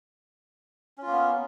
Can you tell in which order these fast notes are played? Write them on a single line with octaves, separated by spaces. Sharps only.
C#4 F4 A#3 B3